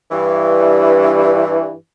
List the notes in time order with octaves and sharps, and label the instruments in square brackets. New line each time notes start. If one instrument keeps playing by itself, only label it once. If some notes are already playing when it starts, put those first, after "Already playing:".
[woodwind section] G2 E3